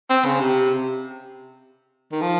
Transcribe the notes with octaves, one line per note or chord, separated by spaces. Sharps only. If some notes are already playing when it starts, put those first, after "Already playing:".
C4
C#3
C3
D#3
F3